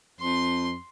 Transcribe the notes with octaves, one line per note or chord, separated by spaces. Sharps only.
F2 C6